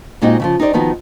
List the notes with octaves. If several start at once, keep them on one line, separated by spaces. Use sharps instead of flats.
A#2 G#3 C4 D#4 F#4 G5
C#3 E3 F3
D#4 G4 C5 D5
D#3 F3 B3 D#4 F#4